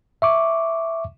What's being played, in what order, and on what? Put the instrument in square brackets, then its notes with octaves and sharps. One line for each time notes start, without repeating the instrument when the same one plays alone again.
[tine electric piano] E5 C#6 D6